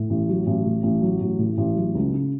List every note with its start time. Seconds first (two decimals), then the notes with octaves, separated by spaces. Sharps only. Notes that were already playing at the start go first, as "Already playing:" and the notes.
Already playing: A2
0.10 A1
0.29 F#3
0.47 A1
0.66 A2
0.83 A1
1.02 F#3
1.21 A1
1.39 A2
1.58 A1
1.76 F#3
1.95 C#2
2.13 C#3